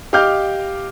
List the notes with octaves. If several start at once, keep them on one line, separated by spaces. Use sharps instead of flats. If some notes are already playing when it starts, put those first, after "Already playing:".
G4 D#5 F5 D6 F6 G6